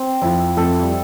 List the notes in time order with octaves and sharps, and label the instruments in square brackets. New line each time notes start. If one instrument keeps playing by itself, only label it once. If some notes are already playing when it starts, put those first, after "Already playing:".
Already playing: [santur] C4
[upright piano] F2 F3 [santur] E4
[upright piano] F2 F3 [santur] A4
[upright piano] G3